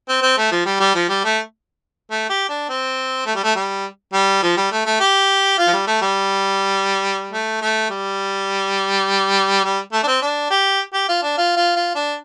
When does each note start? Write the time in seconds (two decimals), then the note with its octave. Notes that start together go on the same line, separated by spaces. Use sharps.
0.09 C4
0.23 C4
0.38 A3
0.51 F3
0.66 G3
0.80 G3
0.95 F3
1.09 G3
1.24 A3
2.11 A3
2.30 G4
2.49 D4
2.69 C4
3.26 A3
3.35 G3
3.44 A3
3.55 G3
4.13 G3
4.43 F3
4.57 G3
4.71 A3
4.86 A3
5.00 G4
5.58 F4
5.67 F3
5.73 G3
5.87 A3
6.02 G3
7.32 A3
7.61 A3
7.90 G3
9.64 G3
9.93 A3
10.03 D4
10.07 C4
10.22 D4
10.50 G4
10.94 G4
11.09 F4
11.23 D4
11.38 F4
11.57 F4
11.76 F4
11.95 D4